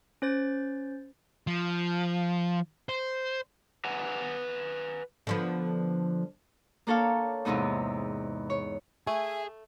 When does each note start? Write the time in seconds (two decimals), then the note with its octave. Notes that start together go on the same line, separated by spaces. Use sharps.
0.22 C#4 C5 A6
1.47 F3
2.89 C5
3.85 B4 F#5 G#5 A#5
5.27 D3 F3 B3
6.87 A#3 D4 A4 C#5 F5
7.45 E2 G#2 C3 B3 D#4
8.50 C#5
9.07 A3 G#4 E5 G#5